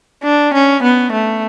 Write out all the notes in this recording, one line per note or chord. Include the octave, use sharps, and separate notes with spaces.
D4
C#4
B3
A3